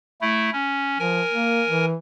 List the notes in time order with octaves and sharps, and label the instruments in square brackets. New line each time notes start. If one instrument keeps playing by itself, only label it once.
[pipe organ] A3 E4
C#4
[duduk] F3 [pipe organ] A#4 G#5
[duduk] A#3
E3